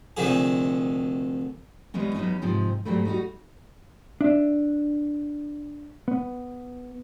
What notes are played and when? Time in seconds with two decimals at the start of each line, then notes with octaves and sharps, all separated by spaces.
0.17 D2 C3 D#3 F3 G#4
1.94 E3 G3 G#3 B3 C#4
2.14 E3 F#3 B3 C#4 D#4
2.42 G#2 C3 F3 D#4
2.85 E2 G#2 F#3 G3 A3
3.05 G3 D#4 F4 F#4
4.21 D4 E5
6.08 B3